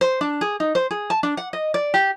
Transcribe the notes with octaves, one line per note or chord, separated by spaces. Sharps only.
C5
D4
G#4
D#4
C5
G#4
A5
D4
F#5
D#5
D5
G4